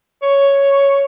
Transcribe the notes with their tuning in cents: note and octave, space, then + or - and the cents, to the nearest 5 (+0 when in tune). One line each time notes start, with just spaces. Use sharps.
C#5 +5